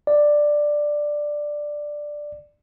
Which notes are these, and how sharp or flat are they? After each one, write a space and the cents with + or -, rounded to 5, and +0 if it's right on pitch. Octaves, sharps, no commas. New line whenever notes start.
D5 +5